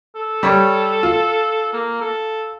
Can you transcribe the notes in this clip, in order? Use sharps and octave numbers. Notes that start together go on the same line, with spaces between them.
A4
G3 C#5
F4
A#3
A4